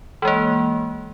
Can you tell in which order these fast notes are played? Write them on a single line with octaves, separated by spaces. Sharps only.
E3 G#3 A#3